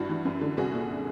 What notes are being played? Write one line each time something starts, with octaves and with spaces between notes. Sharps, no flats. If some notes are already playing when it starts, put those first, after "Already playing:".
Already playing: G2 E4 F#4
E3
F#2
D3
C2 F#4 G#4
A#2